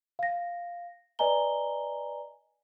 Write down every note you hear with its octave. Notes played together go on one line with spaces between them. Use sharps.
F5 A#6
B4 D5 D#5 G#5 A#5 G7